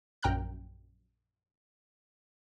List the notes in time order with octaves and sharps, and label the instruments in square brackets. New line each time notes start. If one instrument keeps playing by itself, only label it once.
[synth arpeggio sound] A#1 F#2 G5 A#5 F6 F#6